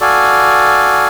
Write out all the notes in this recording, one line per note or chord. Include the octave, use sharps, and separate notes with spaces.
F#4 A4 D5 F5 G#5